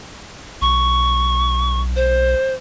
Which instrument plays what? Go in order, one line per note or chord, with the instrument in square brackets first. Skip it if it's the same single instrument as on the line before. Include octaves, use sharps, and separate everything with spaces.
[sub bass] B1 [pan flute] C#6
[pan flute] C5